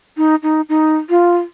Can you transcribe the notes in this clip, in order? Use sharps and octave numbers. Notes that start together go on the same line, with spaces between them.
D#4
D#4
D#4
F4